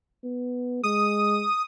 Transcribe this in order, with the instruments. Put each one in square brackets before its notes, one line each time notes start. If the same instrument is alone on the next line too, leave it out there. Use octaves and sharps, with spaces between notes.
[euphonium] B3
[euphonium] G#3 [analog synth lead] D#6